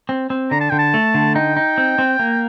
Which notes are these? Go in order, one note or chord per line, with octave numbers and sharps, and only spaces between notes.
C4
C4
D3 A#5
A5
D3 G5
A5
A3
D3
D#4 G5
D#4
C4
C4
A#3